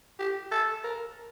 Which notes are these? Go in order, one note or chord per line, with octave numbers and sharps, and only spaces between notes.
G4
A4
A#4